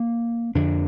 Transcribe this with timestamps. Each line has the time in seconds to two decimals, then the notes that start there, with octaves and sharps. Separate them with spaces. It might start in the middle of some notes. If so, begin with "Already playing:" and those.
Already playing: A#3
0.55 F2 D3 D4